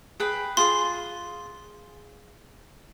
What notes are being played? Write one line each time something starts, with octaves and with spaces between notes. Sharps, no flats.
G#4 B4 G5
F4 G#4 C6